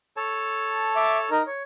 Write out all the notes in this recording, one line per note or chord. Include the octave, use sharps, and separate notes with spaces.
A4 C#5 A5
E5 D6
D#4 A#4
C#5